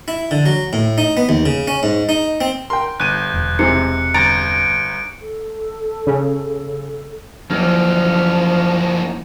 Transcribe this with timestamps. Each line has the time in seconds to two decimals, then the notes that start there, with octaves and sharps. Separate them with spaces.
0.08 E4
0.31 D3
0.46 F#3
0.73 A2
0.98 D#4
1.17 B3
1.29 D#2
1.46 C#3
1.68 C#4
1.83 G#2
2.09 D#4
2.41 C4
2.70 A#4 G5 C6
3.00 G1 F#6 D#7
3.33 E1
3.59 C3 E3 G#3 C#7
4.14 G1 A#5 A6 D7
5.22 A4
6.07 C#3
7.51 F#2 E3 F3 A#3 C#4 F6